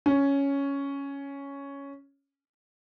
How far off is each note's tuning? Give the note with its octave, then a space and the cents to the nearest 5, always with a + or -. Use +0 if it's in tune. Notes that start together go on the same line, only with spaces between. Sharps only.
C#4 +5